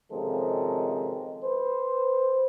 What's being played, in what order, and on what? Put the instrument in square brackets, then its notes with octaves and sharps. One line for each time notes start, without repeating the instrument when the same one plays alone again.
[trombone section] C3 D#3 F3 G#3 C#4 A4
B4 C5